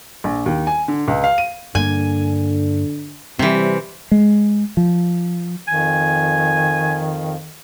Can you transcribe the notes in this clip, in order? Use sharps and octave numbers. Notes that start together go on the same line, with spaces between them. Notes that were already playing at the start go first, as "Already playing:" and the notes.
A#1
D#2
G#5
D3
C#2
F5
D#7
G2 D3 A#3 G#5
C3 E3 G3 C4
G#3
F3
F2 D#3 G#5